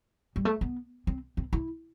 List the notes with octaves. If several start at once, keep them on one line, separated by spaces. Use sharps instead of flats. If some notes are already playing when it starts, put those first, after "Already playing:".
G3
A3
B3
C4
C4
E4